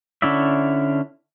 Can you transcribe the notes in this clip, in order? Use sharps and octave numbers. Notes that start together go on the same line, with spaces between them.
D3 C#4 E4 D5 E5